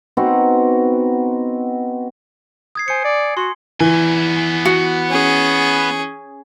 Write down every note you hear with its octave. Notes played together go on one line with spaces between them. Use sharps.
B3 C4 D#4 F#4
D#6 G#6 C7
C5 G#5 C#7
D5
F#4 C6
E3 B3 G#5
F#4
C#4 G#4